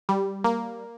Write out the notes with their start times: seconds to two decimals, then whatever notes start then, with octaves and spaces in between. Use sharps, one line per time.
0.09 G3
0.44 A#3